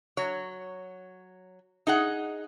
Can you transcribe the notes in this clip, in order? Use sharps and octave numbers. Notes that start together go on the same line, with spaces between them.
F#3 C#5
D#4 G#4 F#5